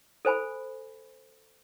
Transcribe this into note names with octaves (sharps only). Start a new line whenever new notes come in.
A4 C5 G#5 B5